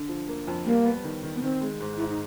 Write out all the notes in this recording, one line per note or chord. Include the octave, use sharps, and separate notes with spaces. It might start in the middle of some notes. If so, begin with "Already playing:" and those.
Already playing: D3
F3
A#3
F2
G3 A#3
B3
D#3
D#3
B3
D#3 C4
G#3
G#2
G#2 E4
D#4